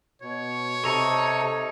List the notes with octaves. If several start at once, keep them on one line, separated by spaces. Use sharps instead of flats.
B2 C#5
C3 D#4 A4 A#5 C#6